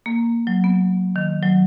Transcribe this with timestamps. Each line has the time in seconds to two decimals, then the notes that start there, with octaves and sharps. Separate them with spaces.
0.06 A#3
0.47 F#3
0.64 B3
1.16 D#3
1.43 F#3